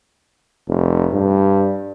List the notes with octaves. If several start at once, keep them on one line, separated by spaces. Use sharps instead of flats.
F1
G2